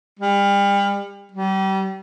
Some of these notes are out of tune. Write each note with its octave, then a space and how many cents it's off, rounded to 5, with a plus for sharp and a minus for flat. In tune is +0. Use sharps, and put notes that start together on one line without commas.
G3 +35
G3 -30